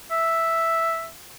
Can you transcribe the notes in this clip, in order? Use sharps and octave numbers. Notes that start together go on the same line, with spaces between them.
E5